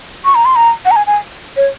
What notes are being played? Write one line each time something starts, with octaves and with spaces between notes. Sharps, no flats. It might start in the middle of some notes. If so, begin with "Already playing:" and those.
C#6
A#5
C6
A#5
F#5
A#5
G#5
G#5
C#5